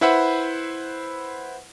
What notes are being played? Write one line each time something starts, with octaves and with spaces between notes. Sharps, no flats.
E4 B4 C5 E5 F#5 B5